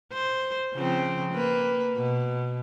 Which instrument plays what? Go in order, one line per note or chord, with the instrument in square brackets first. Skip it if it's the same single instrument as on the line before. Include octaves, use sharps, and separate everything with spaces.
[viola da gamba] C5
C#3 F3 C4
A#3 B4
B2